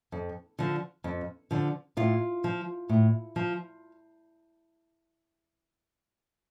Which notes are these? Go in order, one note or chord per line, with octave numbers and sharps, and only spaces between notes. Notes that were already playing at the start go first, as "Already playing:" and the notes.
F2
D3 F3
F2
D3 F3
A2 F4
F3
A2
F3